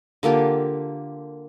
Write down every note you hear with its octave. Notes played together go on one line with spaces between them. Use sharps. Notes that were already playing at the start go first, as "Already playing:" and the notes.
D3 A#3 F4 G4